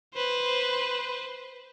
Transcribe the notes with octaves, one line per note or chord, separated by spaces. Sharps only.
B4 C5